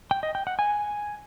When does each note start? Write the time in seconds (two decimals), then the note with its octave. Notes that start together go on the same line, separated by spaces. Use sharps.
0.11 G5
0.23 D#5
0.35 G5
0.47 F#5
0.59 G#5